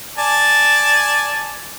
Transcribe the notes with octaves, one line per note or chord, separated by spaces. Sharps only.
D5 G#5 A5